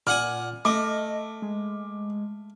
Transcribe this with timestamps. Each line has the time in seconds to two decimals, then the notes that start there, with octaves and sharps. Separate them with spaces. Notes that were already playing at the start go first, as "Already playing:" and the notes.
0.07 A#2 D5 F#5 G#5 F6
0.65 A3 D#5 D6
1.42 G#3